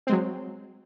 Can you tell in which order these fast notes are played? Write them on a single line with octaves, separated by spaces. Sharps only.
C4 G#3 F#3